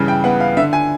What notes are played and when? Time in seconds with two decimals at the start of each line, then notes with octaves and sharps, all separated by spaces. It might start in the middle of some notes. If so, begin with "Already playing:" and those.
Already playing: G2 C#3 E3
0.08 G5
0.24 B3 F#5
0.40 F5
0.57 D3 E5
0.73 G#5